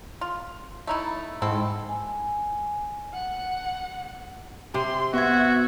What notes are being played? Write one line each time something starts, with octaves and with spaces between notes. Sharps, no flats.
F4
A3 D#4 E4
G#2 C4 E4 A4
G#5
F#5
C3 C6
B3 F#4 E5 G#6